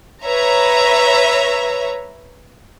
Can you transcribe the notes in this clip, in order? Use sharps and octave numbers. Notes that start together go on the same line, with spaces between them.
B4 C#5 E5 A#5